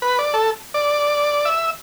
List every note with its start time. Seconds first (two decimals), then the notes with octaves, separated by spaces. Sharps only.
0.02 B4
0.19 D5
0.34 A4
0.74 D5
1.45 E5